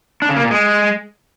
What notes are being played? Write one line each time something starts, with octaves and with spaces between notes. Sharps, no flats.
D4
C#3
A#3
A#2
G#3